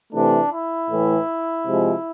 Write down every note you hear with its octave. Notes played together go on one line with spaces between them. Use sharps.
C3 E3 A3 D4
E4
A2 E3 A3
C3 F3 G#3